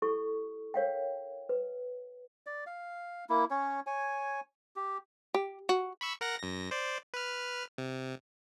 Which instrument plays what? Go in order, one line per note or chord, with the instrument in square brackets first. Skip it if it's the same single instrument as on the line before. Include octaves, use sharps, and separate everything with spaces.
[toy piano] E4 G4 A4 C#6
A#4 C#5 F5 G5
B4
[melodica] D5
F5
A#3 E4
C#4 C#5
C#5 G#5
G4
[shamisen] G4
F#4
[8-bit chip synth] B5 C#6 E6
A#4 F#5 A#6
F#2 A#6
C5 D5
B4 F6
C3